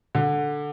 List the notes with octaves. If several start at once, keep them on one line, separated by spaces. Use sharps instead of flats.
D3